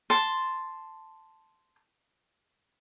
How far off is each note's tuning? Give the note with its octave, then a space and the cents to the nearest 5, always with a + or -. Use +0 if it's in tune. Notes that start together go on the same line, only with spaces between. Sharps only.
A5 +0 C6 +0